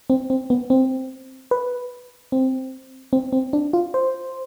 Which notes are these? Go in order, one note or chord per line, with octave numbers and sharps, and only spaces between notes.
C4
C4
B3
C4
B4
C4
C4
C4
D4
F4
C5